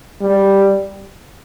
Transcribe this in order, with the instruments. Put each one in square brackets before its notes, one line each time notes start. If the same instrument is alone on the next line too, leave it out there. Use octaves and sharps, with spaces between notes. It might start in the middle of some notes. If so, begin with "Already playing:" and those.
[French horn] G3